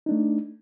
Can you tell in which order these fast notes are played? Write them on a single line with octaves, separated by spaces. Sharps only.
D#4 D4 A3